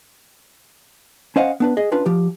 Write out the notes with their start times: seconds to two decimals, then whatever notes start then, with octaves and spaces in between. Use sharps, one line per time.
1.36 C#4 C5 D#5 F5 F#5
1.60 B3 D4 B4
1.77 G#4 D#5
1.92 C#4 D4 F4 B4
2.06 F3 G4